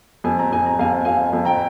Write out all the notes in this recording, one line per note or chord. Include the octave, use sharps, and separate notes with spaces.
F2 G#5
A#5
F2 G#5
A#5
F2 F5 G#5
F2 F5 G#5
F2
G5 A#5